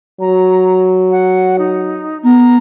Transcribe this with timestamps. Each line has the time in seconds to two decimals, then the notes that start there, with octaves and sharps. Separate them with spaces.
0.21 F#3 A#5
1.11 F#5
1.59 D#4
2.24 B3 A#5